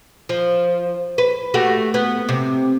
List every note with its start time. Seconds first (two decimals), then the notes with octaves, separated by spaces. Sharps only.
0.29 F3
1.18 B4
1.54 A3 F#4 G4
1.94 B3
2.29 C3